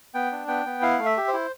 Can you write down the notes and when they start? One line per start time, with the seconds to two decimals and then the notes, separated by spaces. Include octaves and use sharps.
0.14 B3 G5
0.32 D4
0.48 B3 G5
0.66 B3
0.82 E4 F5
0.99 A3
1.06 E5
1.17 G4
1.28 C5
1.33 E4